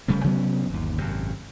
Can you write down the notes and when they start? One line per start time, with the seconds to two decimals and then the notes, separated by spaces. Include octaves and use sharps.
0.08 F1 C#3 G3 A3
0.24 C3 F#3 B3 C#4
0.69 G1 D#2
0.98 G#1 F#2 C3